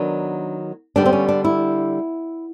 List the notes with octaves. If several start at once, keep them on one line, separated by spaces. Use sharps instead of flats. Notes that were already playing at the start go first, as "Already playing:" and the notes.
Already playing: D#3 F#3 B3 D4
D3 G3 B3 D4
C4
C#4
D4
E4